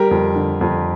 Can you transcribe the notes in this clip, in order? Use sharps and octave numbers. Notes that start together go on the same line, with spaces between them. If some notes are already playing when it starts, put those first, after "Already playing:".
Already playing: G3 G4 A#4
F2
D3
F2